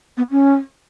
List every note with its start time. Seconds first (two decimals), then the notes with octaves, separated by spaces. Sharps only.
0.17 B3
0.31 C#4